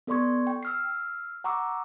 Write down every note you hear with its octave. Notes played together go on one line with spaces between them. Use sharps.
B3 A4 D5 C6 C#6 G#6
G5
E6 F6 C7
F#5 A#5 C#6 D6 E6